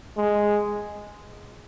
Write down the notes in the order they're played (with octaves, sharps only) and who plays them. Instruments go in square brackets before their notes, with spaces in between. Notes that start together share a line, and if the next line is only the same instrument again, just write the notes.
[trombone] G#3